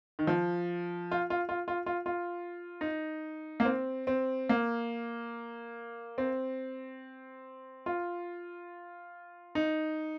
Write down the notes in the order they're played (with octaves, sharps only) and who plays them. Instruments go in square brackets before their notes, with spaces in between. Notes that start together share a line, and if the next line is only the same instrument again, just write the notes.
[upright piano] D#3
F3
F4
F4
F4
F4
F4
F4
D#4
A#3
C4
C4
A#3
C4
F4
D#4